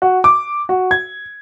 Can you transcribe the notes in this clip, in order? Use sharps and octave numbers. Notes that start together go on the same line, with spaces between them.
F#4
D6
F#4
G#6